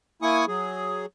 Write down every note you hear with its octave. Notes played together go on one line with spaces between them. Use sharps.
A#3 E4 G#5 C#6 D#6
F#3 G#4